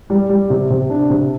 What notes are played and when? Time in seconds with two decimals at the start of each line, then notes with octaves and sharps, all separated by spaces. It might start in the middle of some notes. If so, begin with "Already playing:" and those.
0.10 G3
0.29 G3
0.50 C3
0.70 C3
0.90 D4
1.10 C3